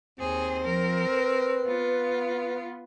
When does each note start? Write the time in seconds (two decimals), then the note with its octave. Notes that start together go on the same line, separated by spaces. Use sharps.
0.19 D#2 C4 G#4
0.65 F3 A#4
1.11 B4
1.64 B3 F4